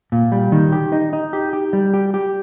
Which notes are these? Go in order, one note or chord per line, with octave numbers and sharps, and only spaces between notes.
A#2
G3
D#3
G4
D#4
D#4
G4
G4
G3
G4
G4